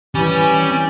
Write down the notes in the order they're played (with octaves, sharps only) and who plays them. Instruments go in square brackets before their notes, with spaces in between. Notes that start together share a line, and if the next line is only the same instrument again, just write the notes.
[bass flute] E3 [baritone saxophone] G3 [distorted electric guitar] C#4